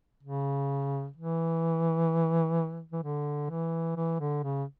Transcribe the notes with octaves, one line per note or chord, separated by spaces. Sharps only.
C#3
E3
E3
D3
E3
E3
D3
C#3